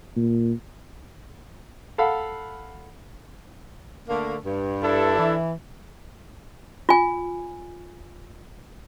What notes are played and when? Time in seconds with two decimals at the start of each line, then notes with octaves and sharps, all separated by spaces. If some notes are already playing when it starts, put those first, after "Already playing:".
0.16 A#2
1.98 A4 F5 F#5 B5
4.08 D3 A3 A#3
4.45 G2
4.83 D4 E4 A4
5.18 E3
6.89 F4 G#5